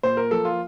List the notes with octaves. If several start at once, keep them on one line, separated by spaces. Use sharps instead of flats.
A#2 C5
A#4
F3 A#3 A4
F4